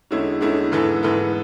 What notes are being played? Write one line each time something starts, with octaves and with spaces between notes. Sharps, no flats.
E2 D3 G#3 C#4 E4
E2 D3 G#3 C#4 E4
G#2 E3 B3 E4 A4
G#2 E3 B3 E4 A4